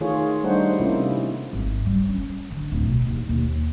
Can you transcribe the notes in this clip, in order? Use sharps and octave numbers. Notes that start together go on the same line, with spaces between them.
D#3 A3 F4 G#4 C#5
G3 A3 D4 D#4 C5 F#5
C3 A#3 C#4 E4 F4
G#1
G3
C#4
D3
D1
B2
D#2
D#2